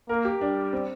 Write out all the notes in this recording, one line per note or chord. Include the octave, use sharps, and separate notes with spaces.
A#3 A#4
G4
G3 D4
C4